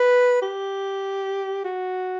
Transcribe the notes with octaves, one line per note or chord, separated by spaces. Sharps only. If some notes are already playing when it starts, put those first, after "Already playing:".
Already playing: B4
G4
F#4